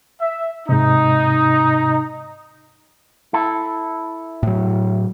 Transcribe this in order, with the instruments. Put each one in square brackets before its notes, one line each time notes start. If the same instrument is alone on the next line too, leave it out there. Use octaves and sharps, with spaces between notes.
[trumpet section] E5
[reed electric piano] G#2 C3 [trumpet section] D#4
[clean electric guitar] E4 A4
[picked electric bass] A2 F#3